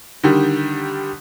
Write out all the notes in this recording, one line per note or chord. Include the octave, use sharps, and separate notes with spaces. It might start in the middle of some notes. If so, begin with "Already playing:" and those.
D3 D#3 G3